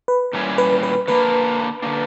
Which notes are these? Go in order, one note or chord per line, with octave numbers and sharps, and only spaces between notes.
B4
A#2 G3 C#4 E4
B4
B4
D3 A#3 D4 B4
D3 A#3 D4